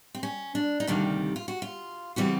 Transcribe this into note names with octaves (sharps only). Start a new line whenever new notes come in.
C4
C#4
D4
D#4
D2 C3 D#3 G3 A#3 D4
F4
F#4
F4
C#3 E3 G3 C4 F#4